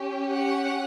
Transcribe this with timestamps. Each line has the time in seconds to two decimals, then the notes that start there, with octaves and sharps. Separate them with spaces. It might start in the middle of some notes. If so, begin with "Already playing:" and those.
Already playing: C#4 G4
0.32 F#5